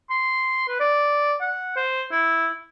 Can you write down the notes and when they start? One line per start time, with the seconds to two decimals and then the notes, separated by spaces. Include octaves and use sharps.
0.10 C6
0.68 B4
0.80 D5
1.41 F#5
1.77 C5
2.11 E4